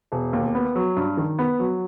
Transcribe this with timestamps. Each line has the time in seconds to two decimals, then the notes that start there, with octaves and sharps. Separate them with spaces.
0.12 E1
0.33 D#2
0.55 B3
0.75 F#3
0.96 G2
1.17 D#3
1.39 B3
1.59 F#3